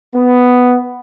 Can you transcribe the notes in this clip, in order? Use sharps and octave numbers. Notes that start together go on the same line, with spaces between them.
B3